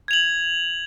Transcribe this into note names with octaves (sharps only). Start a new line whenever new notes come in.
G#6 F7 F#7